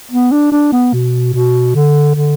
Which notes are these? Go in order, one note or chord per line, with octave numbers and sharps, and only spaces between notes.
B3
D4
D4
B3
B2
B2
D3
D3